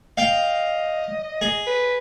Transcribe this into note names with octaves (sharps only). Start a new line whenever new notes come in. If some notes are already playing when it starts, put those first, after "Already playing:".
D#5 F5 G5
G#4
B4